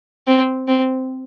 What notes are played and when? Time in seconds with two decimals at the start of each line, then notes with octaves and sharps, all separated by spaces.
0.27 C4
0.68 C4